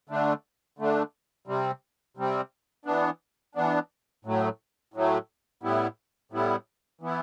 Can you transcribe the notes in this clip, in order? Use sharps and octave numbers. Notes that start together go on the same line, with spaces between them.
D3 A3 D4
D3 A3 D4
C3 G3 C4
C3 G3 C4
E3 B3 D4
E3 B3 D4
A2 F#3 A3
A2 F#3 A3
A2 G3 B3 E4
A2 G3 B3 E4
E3 B3 E4